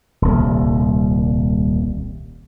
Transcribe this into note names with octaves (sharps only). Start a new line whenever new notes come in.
D#1 C2